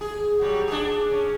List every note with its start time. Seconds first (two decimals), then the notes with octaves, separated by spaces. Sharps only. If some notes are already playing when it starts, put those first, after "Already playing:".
0.01 G#4
0.41 F#3 G3
0.68 D4 G#4
1.11 C#4